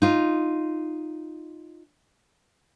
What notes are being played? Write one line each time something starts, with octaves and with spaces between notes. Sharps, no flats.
D#4 F4